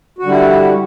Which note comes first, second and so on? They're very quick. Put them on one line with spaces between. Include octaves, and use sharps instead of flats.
F#4 D3 G3 E4